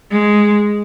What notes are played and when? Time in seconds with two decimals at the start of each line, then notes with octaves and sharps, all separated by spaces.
0.11 G#3